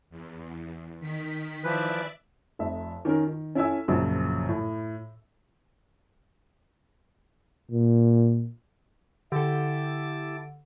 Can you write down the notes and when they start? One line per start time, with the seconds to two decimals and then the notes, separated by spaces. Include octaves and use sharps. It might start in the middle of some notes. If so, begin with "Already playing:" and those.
0.10 E2
1.00 D#3 B6
1.64 E3 F3 B4 D5 E5
2.59 F1 F2 E5
3.05 D#3 C#4 A#4
3.27 D#3
3.55 C#4 E4 A4 E5 G#5 E6
3.88 A#1 F#2 C#3 F3 F#3
4.49 A2
7.71 A#2
9.32 D3 E4 G4 A4 A5 D6